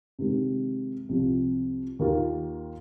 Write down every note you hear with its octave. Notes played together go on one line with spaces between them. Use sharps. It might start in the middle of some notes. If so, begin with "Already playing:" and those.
C3 D#3 G#3
C2 C3 F3
D#2 D#3 A#3 F4